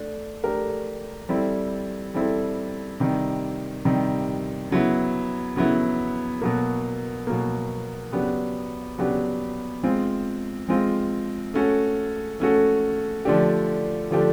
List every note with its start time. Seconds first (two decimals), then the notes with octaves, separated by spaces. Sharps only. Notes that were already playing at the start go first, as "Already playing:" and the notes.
Already playing: A3 D4
0.44 A3 D4 G4 A#4
1.29 G3 C4 E4 A4
2.14 G3 C4 E4 A4
3.00 C3 D#3 G3
3.85 C3 D#3 G3
4.71 C#3 F#3 B3 E4
5.56 C#3 F#3 B3 E4
6.42 B2 F#3 A#3
7.27 B2 F#3 A#3
8.12 C#3 F#3 B3 D4 G4
8.98 C#3 F#3 B3 D4 G4
9.83 G#3 C4 F4
10.69 G#3 C4 F4
11.54 A3 C#4 F#4 A4
12.40 A3 C#4 F#4 A4
13.25 D3 F3 A3 D4 G4
14.11 D3 F3 A3 D4 G4